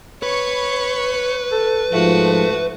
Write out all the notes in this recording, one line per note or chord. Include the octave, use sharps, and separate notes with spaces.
B4 C#5 C#6
A4
G#2 F3 A3 F#4